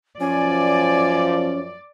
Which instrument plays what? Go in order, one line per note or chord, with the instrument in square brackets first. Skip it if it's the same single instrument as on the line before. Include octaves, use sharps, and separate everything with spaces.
[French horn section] F#2 F3 [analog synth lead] C#4 [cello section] D5 [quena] G#5